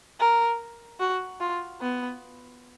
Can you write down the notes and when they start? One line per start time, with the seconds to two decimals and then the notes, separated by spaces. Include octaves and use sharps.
0.20 A#4
1.00 F#4
1.40 F4
1.81 B3